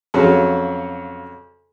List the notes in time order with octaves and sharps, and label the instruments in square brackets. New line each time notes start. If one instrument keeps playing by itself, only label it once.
[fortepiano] F2 C#3 F#3